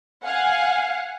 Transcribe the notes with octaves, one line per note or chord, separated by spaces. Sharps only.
F5 F#5 G#5